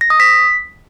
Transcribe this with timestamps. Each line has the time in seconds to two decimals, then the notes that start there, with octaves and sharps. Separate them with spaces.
0.01 A#6
0.10 D#6
0.20 B6